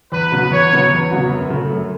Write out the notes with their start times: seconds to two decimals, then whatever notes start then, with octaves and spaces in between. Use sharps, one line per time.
0.12 E2 B4
0.32 C#3 F#3 B3 F#4
0.51 E2 C#5
0.72 C#3 F#3 B3 F#4
0.91 E2
1.11 C#3 F#3 B3 F#4
1.30 F#2
1.50 C#3 A3
1.70 F#2